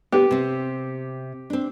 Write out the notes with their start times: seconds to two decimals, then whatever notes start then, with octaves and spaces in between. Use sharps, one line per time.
0.12 B3 G4
0.31 C3 C4
1.50 C4 D4